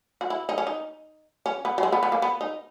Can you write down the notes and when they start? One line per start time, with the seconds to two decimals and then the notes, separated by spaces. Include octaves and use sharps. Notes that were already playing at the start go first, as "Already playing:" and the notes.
0.21 F#4
0.30 E4
0.49 D#4
0.58 C#4
0.67 D#4
1.46 C#4
1.65 B3
1.78 F#3
1.83 G#3
1.92 B3
2.03 B3
2.12 A#3
2.22 B3
2.41 D#4